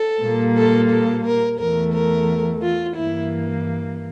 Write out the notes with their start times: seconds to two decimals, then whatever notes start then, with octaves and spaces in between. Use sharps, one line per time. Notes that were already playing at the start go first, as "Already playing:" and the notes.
Already playing: A4
0.21 A#2 G3 A#3
0.56 A4
0.90 A4
1.24 A#4
1.58 E2 E3 A3 A#4
1.93 A#4
2.61 F4
2.95 G2 E3 A#3 E4